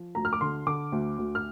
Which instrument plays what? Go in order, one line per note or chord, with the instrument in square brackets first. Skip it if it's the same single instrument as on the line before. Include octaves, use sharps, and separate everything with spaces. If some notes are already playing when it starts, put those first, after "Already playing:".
Already playing: [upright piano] F3
D2 A#5
F6
D6
D3 C6
D3 D6
D2
D2
F6